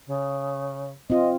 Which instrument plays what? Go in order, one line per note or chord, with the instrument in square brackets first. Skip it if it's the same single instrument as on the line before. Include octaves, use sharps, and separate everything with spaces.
[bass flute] C#3
[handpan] C4 F4 [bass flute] D#5